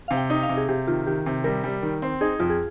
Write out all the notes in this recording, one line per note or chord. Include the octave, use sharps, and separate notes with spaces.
C3 F5
G5
D#4
F5
C3
G#4
C3 G4
D#3 F4
D#3 G4
C3
G3 A#4
G3
D#3
C4
D#4 G#4
F2 F4
G#4